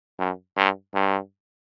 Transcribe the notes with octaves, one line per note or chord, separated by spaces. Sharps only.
F#2
G2
G2